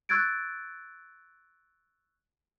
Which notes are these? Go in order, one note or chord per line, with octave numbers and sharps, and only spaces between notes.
C#6 E6 F#6 G#6 A6 D7